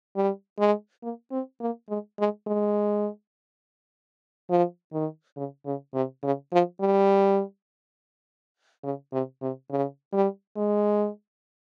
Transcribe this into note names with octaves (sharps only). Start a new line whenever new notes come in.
G3
G#3
A#3
C4
A#3
G#3
G#3
G#3
F3
D#3
C#3
C#3
C3
C#3
F3
G3
C#3
C3
C3
C#3
G3
G#3